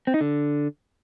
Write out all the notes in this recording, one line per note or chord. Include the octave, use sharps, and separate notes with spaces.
C4
D#4
D3